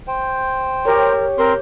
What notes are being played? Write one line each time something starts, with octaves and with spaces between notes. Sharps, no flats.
C5 G5
G4 A#4 C#5
C4 A#4 C6